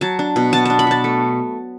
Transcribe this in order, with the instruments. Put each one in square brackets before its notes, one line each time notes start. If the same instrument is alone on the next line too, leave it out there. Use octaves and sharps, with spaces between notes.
[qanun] F#3 A5
D4
B2
B3 A5
D4 A5
B5
B2 A5
A3